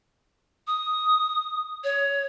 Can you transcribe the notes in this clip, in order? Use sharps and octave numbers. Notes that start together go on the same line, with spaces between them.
D#6
C#5